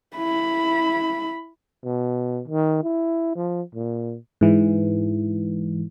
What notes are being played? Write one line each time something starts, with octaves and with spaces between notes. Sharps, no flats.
E4 B5
B2
D#3
E4
F3
A#2
G#2 E3